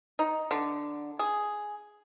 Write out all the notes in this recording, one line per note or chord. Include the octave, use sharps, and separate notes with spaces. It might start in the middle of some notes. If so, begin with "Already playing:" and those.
D#4
D3
G#4